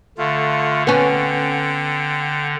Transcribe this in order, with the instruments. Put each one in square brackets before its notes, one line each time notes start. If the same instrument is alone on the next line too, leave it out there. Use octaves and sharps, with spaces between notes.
[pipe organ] D3 [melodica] A3 F4
[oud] B3 C#4 [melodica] G5